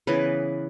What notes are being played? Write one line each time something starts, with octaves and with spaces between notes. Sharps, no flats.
C#3 E3 B3 B4